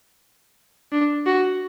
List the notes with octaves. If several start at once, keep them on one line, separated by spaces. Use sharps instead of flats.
D4
F#4